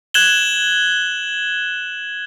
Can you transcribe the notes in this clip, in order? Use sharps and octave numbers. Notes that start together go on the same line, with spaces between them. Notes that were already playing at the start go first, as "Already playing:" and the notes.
F#6 G#6 E7 F#7 G7